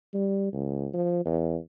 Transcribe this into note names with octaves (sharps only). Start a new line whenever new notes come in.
G3
C#2
F3
E2